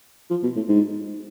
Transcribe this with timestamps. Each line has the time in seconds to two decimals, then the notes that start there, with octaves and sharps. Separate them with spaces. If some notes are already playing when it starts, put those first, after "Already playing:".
0.30 F3
0.43 B2
0.56 A2
0.68 G#2